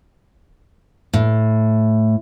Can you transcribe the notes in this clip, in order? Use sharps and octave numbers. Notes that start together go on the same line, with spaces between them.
A2